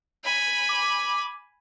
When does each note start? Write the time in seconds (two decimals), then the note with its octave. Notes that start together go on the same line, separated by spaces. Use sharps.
0.24 G#5 B5
0.69 D6